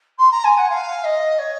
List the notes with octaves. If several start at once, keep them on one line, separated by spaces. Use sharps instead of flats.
C6
A#5
G#5
F#5
F5
D#5
C#5